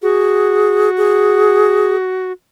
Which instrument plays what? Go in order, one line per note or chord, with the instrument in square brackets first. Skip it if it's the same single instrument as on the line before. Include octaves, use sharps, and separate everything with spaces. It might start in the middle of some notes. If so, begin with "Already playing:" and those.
[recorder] F#4 [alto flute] G#4
[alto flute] G#4